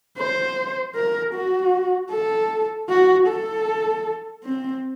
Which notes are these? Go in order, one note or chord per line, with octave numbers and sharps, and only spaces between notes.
C5
A#4
F#4
A4
F#4
A4
C4